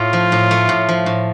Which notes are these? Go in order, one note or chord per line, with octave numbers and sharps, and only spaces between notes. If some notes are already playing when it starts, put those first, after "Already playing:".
Already playing: A2 A3 F4
F3
A2
A3
A2
F3
A2